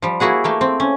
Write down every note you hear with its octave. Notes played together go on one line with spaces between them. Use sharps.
F3 G3
A#3 E4 F#4 G#4 F#5
A3 A#3 G5
C4
C#4